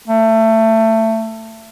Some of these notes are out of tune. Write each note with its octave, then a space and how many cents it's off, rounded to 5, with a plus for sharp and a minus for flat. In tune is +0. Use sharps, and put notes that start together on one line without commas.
A3 +20